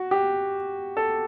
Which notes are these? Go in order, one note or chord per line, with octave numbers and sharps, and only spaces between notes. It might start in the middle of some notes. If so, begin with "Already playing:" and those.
Already playing: F#4
G4
A4